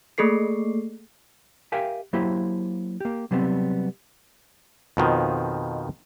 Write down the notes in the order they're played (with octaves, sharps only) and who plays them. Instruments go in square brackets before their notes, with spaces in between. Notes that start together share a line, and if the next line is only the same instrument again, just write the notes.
[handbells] A3 A#3 G#4 A4 C7
[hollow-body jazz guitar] G4 A#4 E5 F5 G5 G#5
F#3 A#3 E4 G4 C5
A#3 G4
C3 F#3 G3 A3 B3 C4
[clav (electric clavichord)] F2 B2 D#3 F3